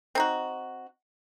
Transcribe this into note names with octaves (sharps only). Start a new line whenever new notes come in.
C4 D#4 F#4